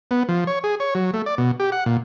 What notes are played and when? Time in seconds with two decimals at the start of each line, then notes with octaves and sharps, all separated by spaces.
0.11 B3
0.29 F3
0.47 C#5
0.64 G#4
0.80 C#5
0.95 F#3
1.14 A3
1.26 D5
1.38 B2
1.60 G4
1.72 F#5
1.86 A#2